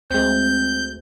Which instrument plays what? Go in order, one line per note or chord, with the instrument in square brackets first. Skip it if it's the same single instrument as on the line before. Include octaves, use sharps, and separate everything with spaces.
[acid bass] D2 [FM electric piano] G#3 C4 [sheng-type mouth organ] G6